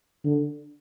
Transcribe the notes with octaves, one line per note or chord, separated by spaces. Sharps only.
D3